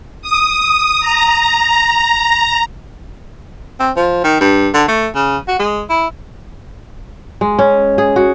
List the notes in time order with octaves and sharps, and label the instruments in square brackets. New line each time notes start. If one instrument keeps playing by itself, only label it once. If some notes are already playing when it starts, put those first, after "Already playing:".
[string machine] D#6
A#5
[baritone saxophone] C4
F3
D#3
G2
D3
A3
C#3
F#4
G#3
E4
[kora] G#3
C#4
G#4
F#4